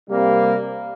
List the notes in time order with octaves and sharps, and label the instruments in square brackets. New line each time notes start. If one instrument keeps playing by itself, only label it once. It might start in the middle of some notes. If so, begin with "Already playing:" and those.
[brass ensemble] C3 G3 A#3